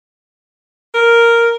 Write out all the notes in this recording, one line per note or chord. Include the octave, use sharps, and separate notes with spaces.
A#4